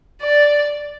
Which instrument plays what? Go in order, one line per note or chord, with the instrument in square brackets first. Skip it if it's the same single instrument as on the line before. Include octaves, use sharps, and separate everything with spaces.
[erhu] D5